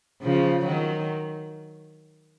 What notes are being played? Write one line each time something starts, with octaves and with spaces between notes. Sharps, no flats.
C#3 F3
D#3 F#3